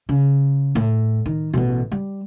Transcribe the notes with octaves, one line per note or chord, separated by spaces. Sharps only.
C#3
A2
D#3
A1 B2
G3